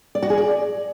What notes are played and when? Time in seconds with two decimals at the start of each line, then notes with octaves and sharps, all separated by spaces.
0.15 D5
0.22 F#4
0.30 G#4
0.38 D5